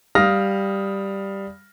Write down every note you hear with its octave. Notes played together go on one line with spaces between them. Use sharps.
G3 F5 D#6 F6 A#6